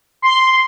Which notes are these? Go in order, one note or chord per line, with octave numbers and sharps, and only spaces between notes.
C6